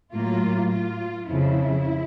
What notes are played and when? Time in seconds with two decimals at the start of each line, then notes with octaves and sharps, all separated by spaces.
0.13 A2 F#3 A#3 F4
0.71 F4
1.29 F2 C#3 F3 E4